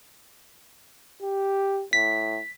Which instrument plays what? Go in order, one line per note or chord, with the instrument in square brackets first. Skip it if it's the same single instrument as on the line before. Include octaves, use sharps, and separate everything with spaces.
[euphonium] G4
[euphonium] A2 [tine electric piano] B6